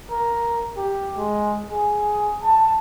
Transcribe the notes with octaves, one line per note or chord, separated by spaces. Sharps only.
A#4
G4
G#3
G#4
A5